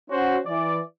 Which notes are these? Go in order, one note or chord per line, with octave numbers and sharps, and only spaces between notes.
C#4 F#4 C5
E3 D5